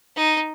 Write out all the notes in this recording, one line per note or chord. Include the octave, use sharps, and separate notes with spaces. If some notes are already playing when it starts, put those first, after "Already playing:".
D#4